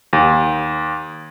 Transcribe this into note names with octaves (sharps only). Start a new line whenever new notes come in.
D#2